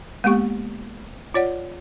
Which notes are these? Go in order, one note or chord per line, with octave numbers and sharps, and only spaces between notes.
G#3 A#3 B3 G4 C#6
F4 C#5 D5 F#5